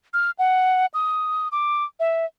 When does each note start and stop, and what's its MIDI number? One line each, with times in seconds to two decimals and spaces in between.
0.14 0.31 89
0.39 0.86 78
0.94 1.48 87
1.52 1.84 86
2.00 2.25 76